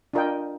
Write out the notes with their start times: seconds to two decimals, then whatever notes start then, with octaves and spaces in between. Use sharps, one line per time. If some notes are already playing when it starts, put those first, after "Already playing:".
0.13 D4 F4 A#4 D#5 G5